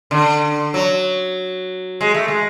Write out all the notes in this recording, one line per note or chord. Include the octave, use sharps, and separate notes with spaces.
D3
F#3
G#3
A3
G#3